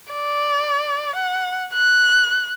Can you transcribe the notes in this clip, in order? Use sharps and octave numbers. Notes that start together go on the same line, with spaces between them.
D5
F#5
F#6